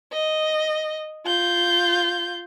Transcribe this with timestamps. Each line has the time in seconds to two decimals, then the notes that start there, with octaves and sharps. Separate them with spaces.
0.12 D#5
1.26 F4 G6